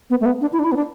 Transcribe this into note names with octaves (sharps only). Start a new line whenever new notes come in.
B3
A3
B3
D4
E4
D4
E4
B3
D4